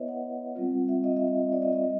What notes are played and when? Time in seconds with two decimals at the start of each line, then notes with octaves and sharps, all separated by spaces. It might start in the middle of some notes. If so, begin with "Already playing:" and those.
Already playing: B3 E4 B4 C#5 D#5 E5
0.08 F#5
0.55 G3 C4 F4
0.88 E5
1.04 D#5
1.16 E5
1.28 D#5
1.52 D5
1.62 D#5
1.73 D#5
1.84 G3